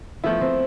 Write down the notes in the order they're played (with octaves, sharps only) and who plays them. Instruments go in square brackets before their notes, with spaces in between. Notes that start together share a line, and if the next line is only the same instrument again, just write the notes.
[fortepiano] F3 A3 E4 [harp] B3
[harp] C4